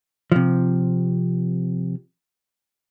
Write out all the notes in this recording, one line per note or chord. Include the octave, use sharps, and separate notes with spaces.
C3 F3